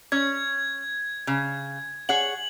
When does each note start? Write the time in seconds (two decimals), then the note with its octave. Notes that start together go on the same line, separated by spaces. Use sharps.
0.12 C#4 C#5 G#6
1.27 C#3
2.09 G#4 C#5 F#5 F#7